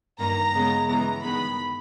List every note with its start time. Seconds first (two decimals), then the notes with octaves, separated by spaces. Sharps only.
0.19 G2 D#3 A#3 A#5
0.54 C#3 G#3 B3
0.88 C#3 E3 G#3 B3 A#5
1.22 G2 D#3 G#3 B3 B5